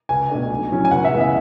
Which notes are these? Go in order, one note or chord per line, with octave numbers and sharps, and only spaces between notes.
C#2 G#5
B2 A3 D4
B1
A2 F#3 C#4
G#5
C#2 F#5
E5
C#3 E3 G#3 B3
E5